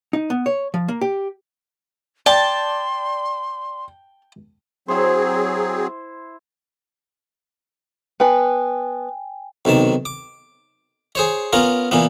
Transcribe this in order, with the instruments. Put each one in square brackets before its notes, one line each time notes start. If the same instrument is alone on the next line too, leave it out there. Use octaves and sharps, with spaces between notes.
[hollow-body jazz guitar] D#4
B3
C#5
F3
A#3
G4
[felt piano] D5 [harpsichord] G5 [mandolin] A5 [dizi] C6
[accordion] F#3 C4 G#4 [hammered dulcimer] E4 C5
[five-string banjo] B3 B4 [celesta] G5 G#5
[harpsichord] B1 C3 D#3 A5
D6
G#4 C5 C#5
B3 C#4 F4 A#4
A#2 E3 B3